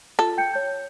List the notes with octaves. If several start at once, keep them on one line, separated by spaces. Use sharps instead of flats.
F4 A4
G5 G6 C#7
C#5 G6